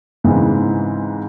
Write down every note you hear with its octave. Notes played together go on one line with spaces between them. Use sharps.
G#2 C#3 E3 C4